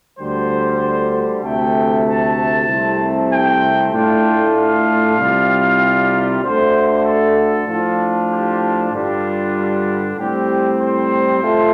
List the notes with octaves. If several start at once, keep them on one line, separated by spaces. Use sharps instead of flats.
D2 D3 G3 C5
D2 C3 A3 G5
A5
C2 C3 A3 C4
G5
A2 A3 D4 F4 G5
F5
C2 C3 G3 F4
D2 D3 A3 C5
A4
A2 F3 D4 F4
G4
G2 D3 G3 D4 F4
A2 G3 C4 G4
C5
A3 F4